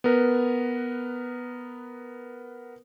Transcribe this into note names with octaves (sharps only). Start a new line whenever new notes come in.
B3 A#4 B4